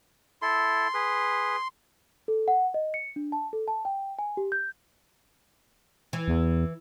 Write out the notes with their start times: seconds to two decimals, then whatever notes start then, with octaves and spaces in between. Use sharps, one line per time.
0.42 E4 A4 C6
0.94 G#4 B4
2.28 A4
2.48 F#5
2.74 D#5
2.94 C#7
3.16 D4
3.32 A5
3.53 A4
3.68 A5
3.85 G5
4.19 G#5
4.37 G4
4.52 G6
6.13 E3
6.28 E2